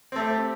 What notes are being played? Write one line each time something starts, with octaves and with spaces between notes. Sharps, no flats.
A3 C4 G4